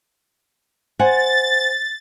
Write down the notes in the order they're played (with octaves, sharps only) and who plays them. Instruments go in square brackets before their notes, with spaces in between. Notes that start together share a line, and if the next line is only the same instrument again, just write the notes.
[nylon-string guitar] C5 F#5 G#5 [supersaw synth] A6